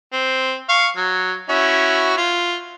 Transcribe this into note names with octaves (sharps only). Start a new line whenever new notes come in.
C4
F5 C#6
F#3
C#4 E4 F#4
F4